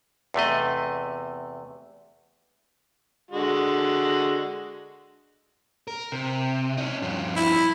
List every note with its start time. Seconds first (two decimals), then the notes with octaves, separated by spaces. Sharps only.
0.34 E2 C3 A3 D#5
3.31 D3 G#3 F#4
5.88 A#4
6.12 C3
6.77 C#4 D#4
7.02 G2 F3
7.36 E4